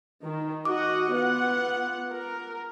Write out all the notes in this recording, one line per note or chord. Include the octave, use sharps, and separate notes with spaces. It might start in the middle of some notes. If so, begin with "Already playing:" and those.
D#3
F#4 D#5 F#5 D6
B3 F4 F#5
A#4